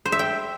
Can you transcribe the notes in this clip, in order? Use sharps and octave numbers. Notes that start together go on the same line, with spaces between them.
C5
E5
G5